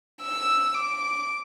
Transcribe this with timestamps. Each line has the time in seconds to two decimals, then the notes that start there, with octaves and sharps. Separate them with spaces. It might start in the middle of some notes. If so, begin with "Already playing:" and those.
0.22 E6
0.75 D6